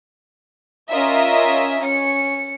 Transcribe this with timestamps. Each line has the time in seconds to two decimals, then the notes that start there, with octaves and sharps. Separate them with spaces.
0.90 C#4 F4 A#4 D#5 E5
1.81 C#4 C#7